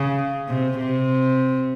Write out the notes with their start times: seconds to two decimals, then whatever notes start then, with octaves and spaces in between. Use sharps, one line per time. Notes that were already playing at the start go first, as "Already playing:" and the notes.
Already playing: C#3
0.48 C3
0.77 C3